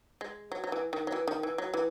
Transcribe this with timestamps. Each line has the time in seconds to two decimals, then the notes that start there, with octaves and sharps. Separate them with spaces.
0.21 G#3
0.52 F#3
0.64 F#3
0.72 E3
0.93 D#3
1.07 F#3
1.12 E3
1.28 D#3
1.43 E3
1.58 F#3
1.74 E3